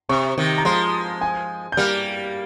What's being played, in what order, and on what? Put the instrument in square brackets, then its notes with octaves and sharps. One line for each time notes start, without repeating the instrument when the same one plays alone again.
[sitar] C3 [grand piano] C#6
[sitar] C3 D#3
[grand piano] A#5
[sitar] F3 G#3 [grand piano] C6
[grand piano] G#5
G6
[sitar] G3 A#3 [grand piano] F6